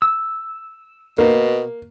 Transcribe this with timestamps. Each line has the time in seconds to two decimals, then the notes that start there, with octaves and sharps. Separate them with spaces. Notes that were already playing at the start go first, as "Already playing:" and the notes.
0.02 E6
1.18 B2 A#3